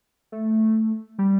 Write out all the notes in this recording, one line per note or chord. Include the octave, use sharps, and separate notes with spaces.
A3
G3